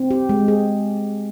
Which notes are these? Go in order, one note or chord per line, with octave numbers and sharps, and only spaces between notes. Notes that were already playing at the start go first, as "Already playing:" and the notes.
Already playing: C4
G4
G#3
G#4